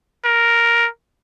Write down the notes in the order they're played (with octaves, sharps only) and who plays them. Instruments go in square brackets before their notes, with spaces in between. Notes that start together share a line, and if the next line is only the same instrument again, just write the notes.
[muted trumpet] A#4